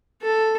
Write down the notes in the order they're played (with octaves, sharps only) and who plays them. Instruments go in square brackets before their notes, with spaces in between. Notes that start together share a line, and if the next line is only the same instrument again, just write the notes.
[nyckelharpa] A4